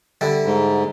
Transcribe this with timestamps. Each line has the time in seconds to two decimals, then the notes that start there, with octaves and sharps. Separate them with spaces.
0.21 D3 G3 E4
0.46 G#2